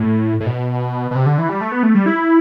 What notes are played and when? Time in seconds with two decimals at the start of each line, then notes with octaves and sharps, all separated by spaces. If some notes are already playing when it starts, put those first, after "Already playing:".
Already playing: A2
0.40 A2
0.46 B2
1.11 B2
1.15 C3
1.26 D3
1.38 E3
1.49 G3
1.61 A3
1.72 B3
1.83 A3
1.95 G3
2.06 E4